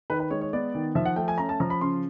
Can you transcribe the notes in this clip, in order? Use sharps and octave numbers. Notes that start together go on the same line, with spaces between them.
D#3 B4
B4
G#3 C#5
C#5
B3 D5
D#3
F3 E5
F#5
A3 G5
G#5
C#4 A#5
A5
F3 A#5
B5
C#3 C6